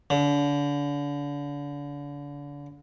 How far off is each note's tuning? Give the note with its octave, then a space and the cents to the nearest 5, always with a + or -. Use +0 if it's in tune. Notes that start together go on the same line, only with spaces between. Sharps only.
D3 -35